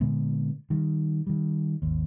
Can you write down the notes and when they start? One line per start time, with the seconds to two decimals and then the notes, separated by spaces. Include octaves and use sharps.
0.01 A#2 D3 G#3 B3
0.70 D#3 G3
1.27 D#3 G3
1.82 G#1 D#2